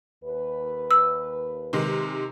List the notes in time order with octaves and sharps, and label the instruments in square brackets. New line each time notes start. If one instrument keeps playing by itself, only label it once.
[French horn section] D#2 B4
[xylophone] E6
[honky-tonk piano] C3 D#3 G#3